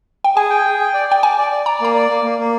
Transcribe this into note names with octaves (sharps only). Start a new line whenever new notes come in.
G5
G#4 G#5
G5
G#4
G5
D5
D5 G5
D5 G#5
D5
D5
D5 A#5
A#3 A#5
D5
A#3
A#3
A#3